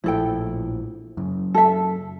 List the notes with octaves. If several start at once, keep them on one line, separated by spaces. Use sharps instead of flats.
A#1 A2 F3 E4 A4 G5
F#2 C#3
A4 E5